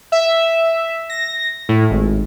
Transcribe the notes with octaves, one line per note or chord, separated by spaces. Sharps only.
E5
A#6
A2
G#1